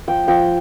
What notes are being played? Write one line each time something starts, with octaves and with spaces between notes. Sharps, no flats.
F3 G5
F3 G5